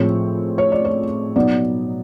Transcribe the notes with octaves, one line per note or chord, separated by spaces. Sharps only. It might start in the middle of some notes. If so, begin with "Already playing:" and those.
Already playing: A2 F3 G#3 C4 C#5
C#5
D5
C#5
B2 F#3 B3 D#4 D5